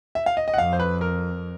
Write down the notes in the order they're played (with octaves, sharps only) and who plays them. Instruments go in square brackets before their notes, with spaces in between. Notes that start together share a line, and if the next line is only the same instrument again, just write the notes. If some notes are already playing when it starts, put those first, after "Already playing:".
[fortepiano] E5
F5
D#5
D#5
F#5
[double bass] F2 [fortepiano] F5
[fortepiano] C5
B4
A#4